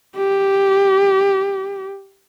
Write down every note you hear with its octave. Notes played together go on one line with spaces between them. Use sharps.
G4